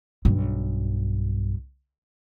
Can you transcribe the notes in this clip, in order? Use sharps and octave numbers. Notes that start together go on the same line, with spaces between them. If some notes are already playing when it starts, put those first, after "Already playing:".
B1 G2